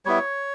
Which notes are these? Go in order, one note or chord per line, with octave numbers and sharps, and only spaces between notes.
G3 B3 E4 C#5